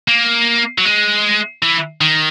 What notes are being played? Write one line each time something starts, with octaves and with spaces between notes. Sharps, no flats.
A#3
F#3
G#3
E3
D#3